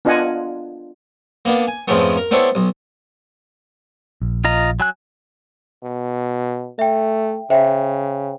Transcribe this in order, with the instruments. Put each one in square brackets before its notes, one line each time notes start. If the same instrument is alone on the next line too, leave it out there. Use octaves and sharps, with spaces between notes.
[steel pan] B3 D4 F4 D#5 F#5 G#5
[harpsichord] A#3 B3 D4
G#5
F2 G#2 C#3 F3 A3 B3
A#4
B3 C4 D4 E4 A4 C#5
B1
[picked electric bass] A#1
[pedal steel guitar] F4 D#5 A#5
F#3 G#5 F#6
[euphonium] B2
[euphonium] A3 [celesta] E5 G5
[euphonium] C#3 [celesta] C5 G5 [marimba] E5